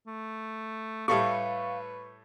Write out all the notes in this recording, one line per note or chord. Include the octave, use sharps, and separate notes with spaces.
A3
A2 G3 A3 B4 F5 C#6